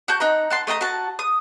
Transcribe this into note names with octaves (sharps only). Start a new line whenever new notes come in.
F#4 A5 G6
D#4 F#5 A#5
F#5 A5 C6
A3 D#5 G5 A#5
F#4 A5
D#6